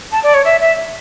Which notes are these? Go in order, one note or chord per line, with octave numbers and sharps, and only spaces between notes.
A5
D5
C#5
E5
E5